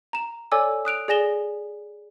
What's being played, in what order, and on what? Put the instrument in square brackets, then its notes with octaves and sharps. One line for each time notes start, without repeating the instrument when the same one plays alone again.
[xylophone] A#5 E7
A4 C#5 D5 G#5 D6 E6
D#6 F#6 D7 F7
G#4 D5 G#5 A#6 E7 G7